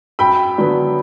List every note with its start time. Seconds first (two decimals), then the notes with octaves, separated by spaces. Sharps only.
0.19 F#2 G5 B5
0.58 D3 F#3 B3